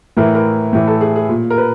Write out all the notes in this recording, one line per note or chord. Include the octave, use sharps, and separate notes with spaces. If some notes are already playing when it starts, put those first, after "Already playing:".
A2 E3 A#4
A#4
A2 E3
A4
G#4
G#4
A#2
A#4
B4